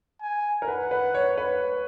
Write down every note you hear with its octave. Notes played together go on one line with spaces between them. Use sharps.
G#5
A#4
B4 F#5
B4
C#5
B4